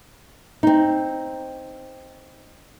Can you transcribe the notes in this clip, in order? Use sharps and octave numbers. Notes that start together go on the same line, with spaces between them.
C4 D#4